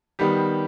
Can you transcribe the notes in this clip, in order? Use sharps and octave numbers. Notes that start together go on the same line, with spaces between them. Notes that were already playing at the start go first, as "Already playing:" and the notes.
D#3 G3 B3 G4